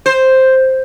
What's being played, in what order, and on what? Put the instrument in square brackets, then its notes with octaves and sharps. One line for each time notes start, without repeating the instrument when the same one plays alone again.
[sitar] C5